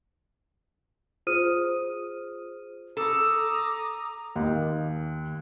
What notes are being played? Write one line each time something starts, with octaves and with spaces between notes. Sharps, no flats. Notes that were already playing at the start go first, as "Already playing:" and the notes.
F4 G#4 C5 D#6 F6 D#7
A4 A#5 D6 D#6
D#2